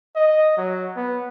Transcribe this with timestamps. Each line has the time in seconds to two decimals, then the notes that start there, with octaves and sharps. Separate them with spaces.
0.16 D#5
0.57 F#3
0.97 B3